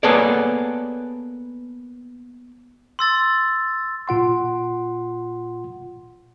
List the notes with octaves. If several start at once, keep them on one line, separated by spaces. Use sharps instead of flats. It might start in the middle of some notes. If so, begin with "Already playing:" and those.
A#3 B3 G#4 A4 C#5 D5
C6 E6 A6
A#2 F4 F#5 C6